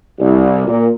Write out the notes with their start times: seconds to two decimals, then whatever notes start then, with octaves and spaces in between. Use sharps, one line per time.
0.19 C2
0.67 A#2